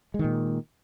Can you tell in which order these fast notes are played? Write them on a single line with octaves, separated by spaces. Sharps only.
G#3 D#3 A#2